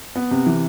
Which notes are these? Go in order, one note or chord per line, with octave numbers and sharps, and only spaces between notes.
B3
C3
E3